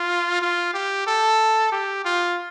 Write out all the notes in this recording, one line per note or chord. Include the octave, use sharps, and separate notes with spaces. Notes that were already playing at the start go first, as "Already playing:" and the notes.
Already playing: F4
F4
G4
A4
G4
F4